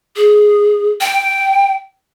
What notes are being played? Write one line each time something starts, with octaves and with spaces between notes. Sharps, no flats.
G#4
G5